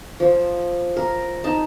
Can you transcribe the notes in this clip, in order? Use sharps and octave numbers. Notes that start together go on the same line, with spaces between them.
F3
A#4
D#4 A5